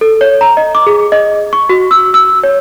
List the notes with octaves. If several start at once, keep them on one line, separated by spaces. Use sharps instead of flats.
A4
C#5
A#5
D#5
D6
G#4
D#5
C#6
F#4
E6
E6
C#5